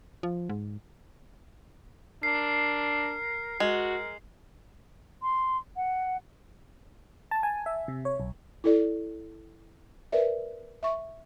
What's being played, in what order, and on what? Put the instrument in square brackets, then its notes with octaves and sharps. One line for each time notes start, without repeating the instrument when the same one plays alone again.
[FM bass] F3
G#2
[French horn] D4 [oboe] A#4 [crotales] C7
[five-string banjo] G#3 [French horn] F#4 [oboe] A#4
[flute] C6
F#5
[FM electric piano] A5
G#5
E5
C3
C#5
B1
[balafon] E4 A4 D5
A#4 B4 D5 E5
E5 C#6